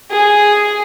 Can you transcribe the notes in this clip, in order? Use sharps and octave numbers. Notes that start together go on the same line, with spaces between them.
G#4